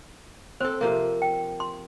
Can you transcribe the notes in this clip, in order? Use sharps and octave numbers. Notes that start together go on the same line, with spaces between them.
C4 A4 C5
C3 F3 A#3
G5
C6